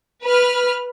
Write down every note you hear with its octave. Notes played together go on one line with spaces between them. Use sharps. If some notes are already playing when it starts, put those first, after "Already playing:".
B4 F6